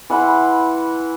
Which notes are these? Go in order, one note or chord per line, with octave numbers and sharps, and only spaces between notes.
E3 F#5 B5 C6